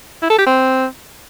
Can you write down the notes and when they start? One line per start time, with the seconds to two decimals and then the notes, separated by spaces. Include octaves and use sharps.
0.22 E4
0.30 A4
0.38 G4
0.46 C4